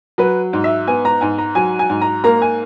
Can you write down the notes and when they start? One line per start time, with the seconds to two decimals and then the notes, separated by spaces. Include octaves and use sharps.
0.18 F#3 B4
0.53 G#2
0.64 E5
0.87 B3 G#5
1.05 A#5
1.21 G#2 G#5
1.38 A#5
1.55 F#3 G#5
1.79 G#5
1.90 G#2
2.01 A#5
2.24 A#3 A#5
2.42 G#5